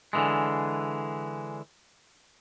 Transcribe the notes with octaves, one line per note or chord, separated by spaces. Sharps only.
D3 E3 G#3